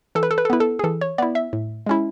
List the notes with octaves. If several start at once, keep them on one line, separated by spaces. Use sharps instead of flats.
E3 A4
B4
A4
B4
A4
B3 E4 B4
A4
G#4
E3 A4
C#5
B3 E4 D5
E5
A2
G#3 C#4 E4